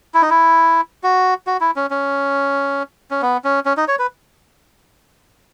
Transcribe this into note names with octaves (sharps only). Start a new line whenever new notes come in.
E4
D#4
E4
F#4
F#4
E4
C#4
C#4
C#4
B3
C#4
C#4
D#4
C#5
B4